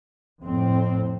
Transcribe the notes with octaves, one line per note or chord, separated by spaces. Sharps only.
F2 A2 C4